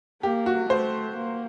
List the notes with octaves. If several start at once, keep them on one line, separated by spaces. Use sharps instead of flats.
A#3 G4
F#4
A3 C5
A#3